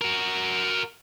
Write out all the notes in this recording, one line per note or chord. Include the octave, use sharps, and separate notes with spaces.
F#4 A#4